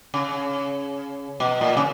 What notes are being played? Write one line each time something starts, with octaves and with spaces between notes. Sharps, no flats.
C#3
B2
A#2
C#3